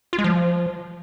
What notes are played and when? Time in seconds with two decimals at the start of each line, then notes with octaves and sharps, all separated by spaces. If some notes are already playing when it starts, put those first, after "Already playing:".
0.13 F4
0.19 G#3
0.24 F3